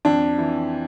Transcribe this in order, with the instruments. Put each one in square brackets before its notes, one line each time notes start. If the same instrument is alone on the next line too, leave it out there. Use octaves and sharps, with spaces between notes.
[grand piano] F2 [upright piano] D4
[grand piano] E3